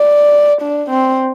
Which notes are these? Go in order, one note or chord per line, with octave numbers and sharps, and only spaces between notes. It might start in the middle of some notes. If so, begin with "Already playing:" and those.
Already playing: D5
D4
C4